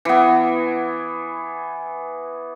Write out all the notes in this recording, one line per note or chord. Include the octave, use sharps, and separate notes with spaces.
E3 B3